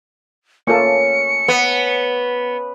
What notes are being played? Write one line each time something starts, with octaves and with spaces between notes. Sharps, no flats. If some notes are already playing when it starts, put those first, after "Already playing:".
A3 A#3 C#4 F4 A4 C#7
B3